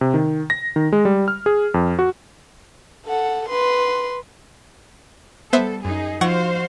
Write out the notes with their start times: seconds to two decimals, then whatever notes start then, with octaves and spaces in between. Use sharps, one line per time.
0.01 C3
0.14 D#3
0.50 A#6
0.76 D#3
0.93 G#3
1.05 G3
1.28 F6
1.46 G#4
1.74 F2
1.99 F#4
3.07 A4 F#5
3.48 B4 C6
5.53 G3 B3 A4 C5 E5
5.85 F#2 D#4 G#4
6.21 F3 D#4 F#4 C5 F5 F#5 C#6